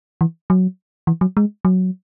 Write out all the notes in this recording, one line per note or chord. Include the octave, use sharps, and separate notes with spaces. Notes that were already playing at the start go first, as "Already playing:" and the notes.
E3
F#3
E3
F#3
G#3
F#3